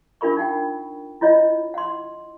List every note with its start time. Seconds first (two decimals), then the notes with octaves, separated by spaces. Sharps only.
0.21 D4 F4 A#4 B5 C#6
0.37 D#4 F#5 G5
1.21 E4 F4 C#5 D#5
1.74 F#5 C6